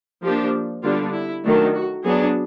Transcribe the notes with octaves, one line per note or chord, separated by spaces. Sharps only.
F3 A#3 D4 G4
D3 G3 B3 D4 F4
E4
D#3 F#3 A3 D4
F#4
F#3 B3 D4 G#4